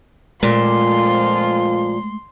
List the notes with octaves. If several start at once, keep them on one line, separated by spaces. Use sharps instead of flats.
F2 A#2 F3 G#3 A3 F4 C6